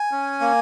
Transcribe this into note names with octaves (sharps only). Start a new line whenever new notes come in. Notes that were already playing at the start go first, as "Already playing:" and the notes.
Already playing: G#5
C#4
A#3